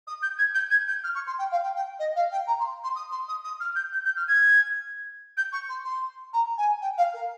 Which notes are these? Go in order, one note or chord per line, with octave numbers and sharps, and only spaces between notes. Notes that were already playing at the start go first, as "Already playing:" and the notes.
D#6
G6
G#6
G6
G#6
G6
F6
C#6
C6
G5
F5
G5
G5
D#5
F5
G5
A#5
C6
C6
D#6
C6
D#6
D#6
F6
G6
G6
G6
F6
G#6
G6
C#6
C6
C6
A#5
G#5
G5
F5
A#4